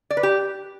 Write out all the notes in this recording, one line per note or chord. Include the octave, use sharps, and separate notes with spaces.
D5
B4
G4